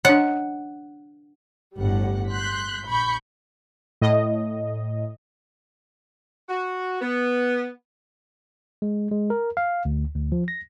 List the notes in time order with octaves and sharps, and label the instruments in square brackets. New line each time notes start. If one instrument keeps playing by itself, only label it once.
[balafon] D4 C#5 [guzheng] F#5
[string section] G1 A2 G3 F#5
C6 F#6 G6 B6
A#1 B5 C#6 G6
[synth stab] A2 D#5
[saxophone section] F#4
B3
[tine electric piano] G#3
G#3
A#4
F5
D2
D2
F3
A#6